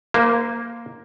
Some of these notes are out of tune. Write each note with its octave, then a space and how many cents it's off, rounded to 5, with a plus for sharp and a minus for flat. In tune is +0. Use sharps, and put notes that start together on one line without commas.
A#3 +0 C5 -35